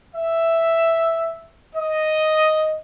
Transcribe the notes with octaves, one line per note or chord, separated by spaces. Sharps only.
E5
D#5